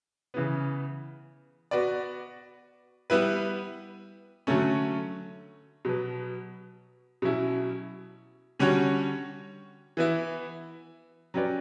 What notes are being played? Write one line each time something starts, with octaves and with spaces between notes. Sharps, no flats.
C#3 E3 B3
B3 F#4 B4 D5
G3 B3 E4 B4
D3 F#3 A3 C#4
B2 F#3 B3
B2 F#3 C#4 E4
D3 G3 C#4 F#4 C#5
E3 B3 E4
F#3 C#4 G4 B4 D5